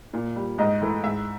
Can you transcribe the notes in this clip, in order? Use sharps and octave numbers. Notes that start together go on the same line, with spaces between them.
A#2
G3
G#2 D#5
E3 A3
G#2 E5